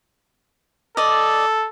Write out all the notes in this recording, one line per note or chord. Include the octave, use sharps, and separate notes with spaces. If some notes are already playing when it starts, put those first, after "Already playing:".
A4 D5 D#5